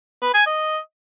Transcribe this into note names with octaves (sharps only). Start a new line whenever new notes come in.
B4
G#5
D#5